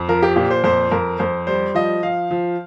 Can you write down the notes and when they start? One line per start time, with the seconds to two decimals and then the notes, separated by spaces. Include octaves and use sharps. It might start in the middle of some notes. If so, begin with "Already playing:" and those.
Already playing: F2
0.08 F3 A#4
0.22 G4
0.36 A#2 G4
0.50 C5
0.64 F2 C5
0.91 F2 A#4
1.19 F2 C5
1.47 G3 C5
1.75 F3 D#5
2.03 F3 F5
2.31 F3